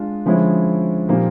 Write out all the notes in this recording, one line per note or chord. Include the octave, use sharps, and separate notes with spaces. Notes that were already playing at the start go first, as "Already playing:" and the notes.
Already playing: G#3 D4 F4
D3 F3 G#3 C#4 E4
A#2 F3 A#3 D#4 G4